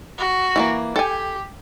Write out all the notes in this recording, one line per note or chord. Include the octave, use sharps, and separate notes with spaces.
F#4
E3 A3 A#3
G4 A4 G5 G#5